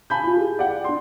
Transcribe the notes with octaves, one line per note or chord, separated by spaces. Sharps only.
G#5 A5 B5 G6
E4 F4
G4 G#4
D5 F#5 G5
D4 C6